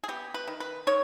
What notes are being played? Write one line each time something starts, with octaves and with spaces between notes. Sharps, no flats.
G#4
B3 G4
B4
D#3
B4
D#3 C#5